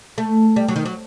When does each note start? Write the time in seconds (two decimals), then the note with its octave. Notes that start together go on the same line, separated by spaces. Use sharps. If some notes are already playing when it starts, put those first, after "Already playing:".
0.18 A3
0.56 G3
0.68 F#3
0.76 D#3
0.86 F#3